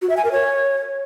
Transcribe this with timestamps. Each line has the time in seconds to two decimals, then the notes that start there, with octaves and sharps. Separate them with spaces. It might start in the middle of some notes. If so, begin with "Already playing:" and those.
0.02 F#4
0.09 E5
0.17 G#5
0.24 A#4
0.32 C#5